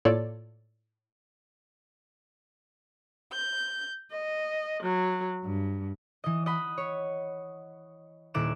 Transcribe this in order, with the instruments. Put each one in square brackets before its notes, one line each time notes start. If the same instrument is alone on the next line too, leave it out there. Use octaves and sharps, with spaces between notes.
[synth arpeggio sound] A2 A#3 F4 A4 C#5 D5
[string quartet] G6
D#5
F#3
G2
[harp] E3 D#5
D#5 F#5 B5
C#5
D#1 A#2 E4 D6 F#6 E7